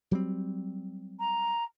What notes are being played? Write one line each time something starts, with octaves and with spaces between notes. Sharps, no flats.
F#3 G3 C4
A#5